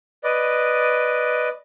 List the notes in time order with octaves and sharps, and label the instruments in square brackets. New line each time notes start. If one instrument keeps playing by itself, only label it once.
[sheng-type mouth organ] B4 D5 D#5